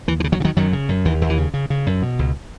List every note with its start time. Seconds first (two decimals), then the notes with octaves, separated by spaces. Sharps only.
0.08 D#2 E3
0.20 E3
0.24 C#3
0.32 D#3 F#3
0.40 C#3
0.44 D#3 F#3
0.57 F#2 D#3 F#3
0.73 C#3
0.89 F#2
1.05 D#2 E3
1.21 D#2
1.30 E3
1.38 C#3
1.54 C#3
1.70 C#3
1.86 F#2
2.02 B2
2.19 C#2